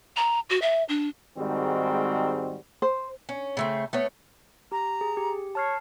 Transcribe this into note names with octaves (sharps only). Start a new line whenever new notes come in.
A#5
F#4
E5
D4
G#2 D#3 G3 G#3 C4 F#4
C5
C#4
C#3 A3 C4
A3 B3 C#5
G4 A#5
G#4
G4
C#5 A5 F6 C7